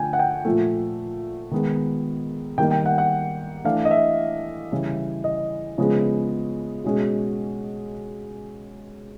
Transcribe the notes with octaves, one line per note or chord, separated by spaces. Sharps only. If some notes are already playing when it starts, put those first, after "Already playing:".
Already playing: D3 F3 A3 G5 G#5
F#5
G5
A#2 F3 A3
D#3 G#3 B3
D#3 G3 A#3 D#4 G5
G5
F#5
F#5
E3 A3 D4 F5
D#5
E5
C#3 E3 G3
D#5
C#3 F3 G#3 B3
B2 G#3 C#4